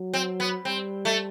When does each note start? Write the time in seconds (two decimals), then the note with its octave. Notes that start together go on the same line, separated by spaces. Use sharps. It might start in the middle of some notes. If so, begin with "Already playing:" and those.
Already playing: F#3
0.14 C4
0.40 B3
0.65 G3 C4
1.05 A3